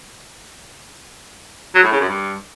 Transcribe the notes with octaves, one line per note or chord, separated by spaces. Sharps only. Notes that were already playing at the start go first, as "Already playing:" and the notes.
F#3
A2
C#3
F#2
G2